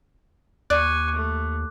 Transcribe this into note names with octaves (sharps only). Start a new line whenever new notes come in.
D#2 D5 G#5 C#6 D6 F#6
A3